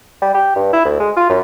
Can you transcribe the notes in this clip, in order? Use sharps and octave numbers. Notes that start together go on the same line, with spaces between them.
G3
G4
G2
E4
D2
G#3
F4
F#2